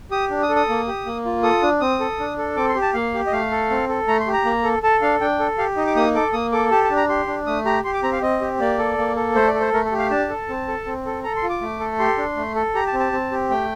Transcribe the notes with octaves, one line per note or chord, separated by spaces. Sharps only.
G4 D#6
D4
D#6
A4
D#6
A#3
G4
A#3
F4
A4 D#6
D4
C4 D#6
A4
D4
A4
C4 D6
C6
G4
A5
A#3 F5
G4
D#5
A3 F5
A4
C4
A4
A3 A#5
C6
G4
A#5
A#3
A4
A4 A5
D4 F5
D4 G5
A4
G4 F5
D#4 D#5
D6
A#3 D#6
A4 D6
A#3 D#6
A4 D6
G4 A5
A5
D4
A#5
G4 C6
D4
A3 D#6
G4 A#5
G4 C6
D6
C4 A#5
F5
C4 D#5
G4
A#3 D5
A4
A#3
A4
A3 C5
D5
A4
C5
A3 A#4
A4
G4
F5
D4 A5
A4
C4
A4
C4
A4
A4 A#5
C6
F4
D6
A3
A4
G4 C6
D4
A3
A4
G4 A#5
A5
C4
A5
C4
G4
A3 G5